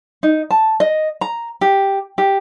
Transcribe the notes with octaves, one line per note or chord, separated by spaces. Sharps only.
D#4
A5
D#5
A#5
G4
G4